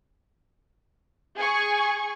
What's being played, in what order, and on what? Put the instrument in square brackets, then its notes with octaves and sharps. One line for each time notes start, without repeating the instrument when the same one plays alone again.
[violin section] G#4 G#5 C#6